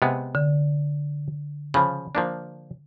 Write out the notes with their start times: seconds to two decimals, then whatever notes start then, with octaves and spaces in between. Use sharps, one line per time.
0.02 C3 G#3 B3
0.35 D3
1.74 C#3 F3 B5
2.15 F3 A#3 D4